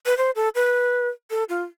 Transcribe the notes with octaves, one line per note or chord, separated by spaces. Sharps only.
B4
C5
A4
B4
A4
F4